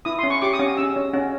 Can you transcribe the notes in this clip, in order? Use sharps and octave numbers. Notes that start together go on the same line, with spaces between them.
E4 D#6
C#4 C6
C#6
G4 D6
D#6
C#4
C#4 E6
C#4
C#4